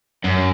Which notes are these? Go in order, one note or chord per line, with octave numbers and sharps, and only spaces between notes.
F#2